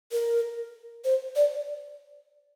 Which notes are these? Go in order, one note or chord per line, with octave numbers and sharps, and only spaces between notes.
A#4
C5
D5